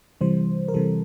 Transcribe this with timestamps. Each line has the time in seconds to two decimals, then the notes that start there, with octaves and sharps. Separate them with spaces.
0.21 C3 E3 G3 C5
0.68 A#4
0.74 C3 E3 G3 A4